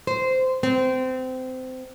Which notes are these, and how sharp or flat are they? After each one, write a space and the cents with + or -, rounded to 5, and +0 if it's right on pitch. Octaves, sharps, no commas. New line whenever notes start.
C5 -15
C4 -25